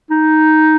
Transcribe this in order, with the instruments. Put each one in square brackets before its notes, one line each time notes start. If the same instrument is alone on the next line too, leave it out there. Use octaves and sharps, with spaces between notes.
[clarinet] D#4